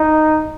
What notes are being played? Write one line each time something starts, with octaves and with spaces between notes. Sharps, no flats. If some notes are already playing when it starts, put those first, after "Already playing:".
Already playing: D#4